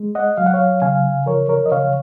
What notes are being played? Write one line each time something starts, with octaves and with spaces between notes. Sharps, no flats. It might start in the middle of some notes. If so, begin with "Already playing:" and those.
Already playing: G#3
D#5 F#5
F#3 F5
F#5
C#5 F5
C#3 F5 G#5
F3 A#4 C#5
A#4 C#5
D#5
C#3 C#5 F5